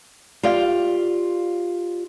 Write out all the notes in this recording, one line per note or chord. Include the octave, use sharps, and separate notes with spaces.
F4 G4 D5 F5